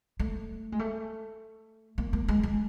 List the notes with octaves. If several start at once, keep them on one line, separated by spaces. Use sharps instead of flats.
A3
G#3
A3
A#3
A#3
G#3
G#3